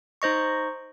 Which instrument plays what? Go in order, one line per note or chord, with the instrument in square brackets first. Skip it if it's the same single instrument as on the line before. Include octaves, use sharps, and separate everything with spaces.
[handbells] D#4 C5 D#5 C#6